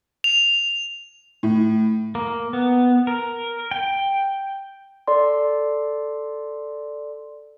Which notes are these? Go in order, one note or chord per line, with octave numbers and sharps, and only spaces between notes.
F7
A2
A#3
B3
A#4
G5
A4 D5 C6